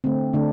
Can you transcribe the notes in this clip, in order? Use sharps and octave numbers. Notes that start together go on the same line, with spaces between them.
D3 A3 C4
D3 A3 D4